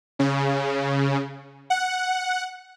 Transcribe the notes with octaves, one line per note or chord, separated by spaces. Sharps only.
C#3
F#5